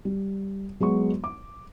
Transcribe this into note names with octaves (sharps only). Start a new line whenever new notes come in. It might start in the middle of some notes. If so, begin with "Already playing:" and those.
G3
F#3 G#3 B3 C#6
D6